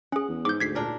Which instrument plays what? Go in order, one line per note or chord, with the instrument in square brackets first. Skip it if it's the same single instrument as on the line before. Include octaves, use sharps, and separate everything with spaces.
[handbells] C#4 G#4 [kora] F#5
[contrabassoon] E2
[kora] G#2 [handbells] D6 G6
[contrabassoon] D2 [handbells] G#6 B6 C7
[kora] A#2 D4 A#4